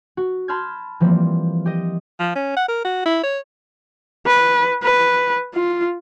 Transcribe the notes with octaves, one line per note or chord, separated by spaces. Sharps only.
F#4
A5 B5 C6 F6 G6 G#6
E3 F3 G3 A#3 C4
G4 D#5
F3
C#4
F#5
A#4
F#4
E4
C#5
B4
B4
F4